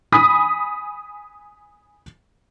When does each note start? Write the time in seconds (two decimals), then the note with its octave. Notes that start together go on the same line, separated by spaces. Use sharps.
0.12 G#5 B5 D#6 B6